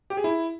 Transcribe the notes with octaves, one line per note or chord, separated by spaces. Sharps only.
G4
G#4
E4